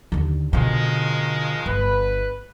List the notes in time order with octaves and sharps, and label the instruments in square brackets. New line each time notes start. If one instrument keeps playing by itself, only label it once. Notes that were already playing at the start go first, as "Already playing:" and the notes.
[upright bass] D#2 D3
[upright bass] B2 D3 [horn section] D#3 F3 G#3
[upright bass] G1 [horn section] B4